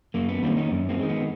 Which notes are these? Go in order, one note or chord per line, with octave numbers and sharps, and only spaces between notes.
F#2 A#3
B3
D#3 G3 A#3 C4
C#4 D#4
F#2
A#3 C4
D#3 G#3
B3